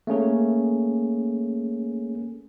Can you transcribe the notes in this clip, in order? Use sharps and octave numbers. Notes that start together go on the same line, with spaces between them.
A3 A#3 C#4 G#4